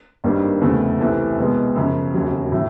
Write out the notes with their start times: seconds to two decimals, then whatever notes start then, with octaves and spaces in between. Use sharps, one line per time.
0.24 G#1 G2 D#3 G3 A#3
0.61 F1 E2 C#3 F3 A3
1.00 C2 C3 E3 A3 C4
1.38 C2 B2 G#3 B3
1.75 F#2 C#3 F3
2.14 E1 D#2 C#3 F#3
2.52 A2 F#3